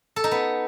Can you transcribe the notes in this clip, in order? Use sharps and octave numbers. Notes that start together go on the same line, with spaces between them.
A4
D#4
B3